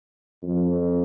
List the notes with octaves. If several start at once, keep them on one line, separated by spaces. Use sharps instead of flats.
F2